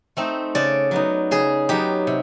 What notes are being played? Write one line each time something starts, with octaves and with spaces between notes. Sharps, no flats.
A3 C4 D#4
C#3 D5
F#3 B3 D#4
C#3 G#4
F#3 B3 D#4 G4
C3